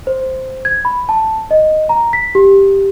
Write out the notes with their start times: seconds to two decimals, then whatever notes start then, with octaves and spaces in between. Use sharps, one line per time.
0.07 C5
0.65 G#6
0.85 B5
1.09 A5
1.51 D#5
1.89 A#5
2.13 B6
2.35 G4